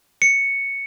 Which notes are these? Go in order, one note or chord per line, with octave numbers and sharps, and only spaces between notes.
C#7